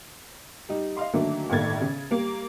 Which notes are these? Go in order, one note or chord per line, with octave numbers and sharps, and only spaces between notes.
G3 D#4
D#5 F5 C6
D3 D#3 F#3 A3 A#3 D4
G1 A2 D#3 A#3 G#6 A6
C#3
G3 A#3